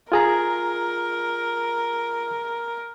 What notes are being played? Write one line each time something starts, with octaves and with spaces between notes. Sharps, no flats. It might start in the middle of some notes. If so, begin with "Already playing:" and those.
F4 G#4 A#4 A#5